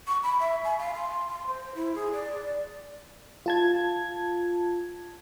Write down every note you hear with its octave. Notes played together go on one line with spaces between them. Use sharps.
C#6
B5
E5
G#5
F5
C6
C6
C5
E4
G#4
D5
F4 A5 G#6